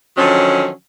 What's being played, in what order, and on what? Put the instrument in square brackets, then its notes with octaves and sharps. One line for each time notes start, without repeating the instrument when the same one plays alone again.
[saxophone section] D3 D#3 F3 F#3 C#4